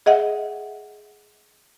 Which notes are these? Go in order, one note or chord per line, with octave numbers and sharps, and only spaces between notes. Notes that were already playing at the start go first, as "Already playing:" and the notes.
G#4 D#5 E5 F#5